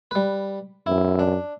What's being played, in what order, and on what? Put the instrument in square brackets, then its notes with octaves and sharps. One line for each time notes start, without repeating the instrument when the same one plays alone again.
[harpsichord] G3 B4
[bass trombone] F#2 [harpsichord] E4
[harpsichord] D4